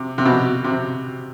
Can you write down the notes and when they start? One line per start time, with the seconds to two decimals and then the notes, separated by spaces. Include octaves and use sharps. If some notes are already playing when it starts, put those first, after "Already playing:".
Already playing: C3
0.18 C3
0.25 B2
0.64 C3